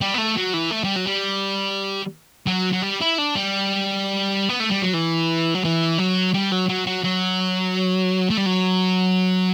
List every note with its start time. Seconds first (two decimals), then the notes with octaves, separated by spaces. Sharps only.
0.01 G3
0.14 B3
0.18 A3
0.37 F#3
0.54 E3
0.71 A3
0.84 G3
0.96 F#3
1.07 G3
2.47 F#3
2.72 F#3
2.82 G3
3.00 E4
3.18 D4
3.35 G3
4.49 B3
4.60 A3
4.71 G3
4.82 F#3
4.94 E3
5.55 F#3
5.64 E3
5.98 F#3
6.34 G3
6.52 F#3
6.69 F#3
6.86 F#3
7.04 F#3
8.30 A3
8.37 G3
8.46 F#3